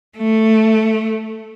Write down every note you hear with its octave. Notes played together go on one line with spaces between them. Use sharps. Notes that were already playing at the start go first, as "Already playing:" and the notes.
A3